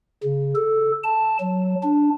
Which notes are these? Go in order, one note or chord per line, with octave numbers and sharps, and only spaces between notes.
C#3
A4
A5
F#3
D4